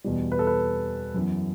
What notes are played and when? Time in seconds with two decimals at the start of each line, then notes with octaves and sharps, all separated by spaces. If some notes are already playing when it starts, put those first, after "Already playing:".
0.04 E2 B2 G3
0.32 B4
0.39 A4
0.47 B4
1.14 F#2 E3 B3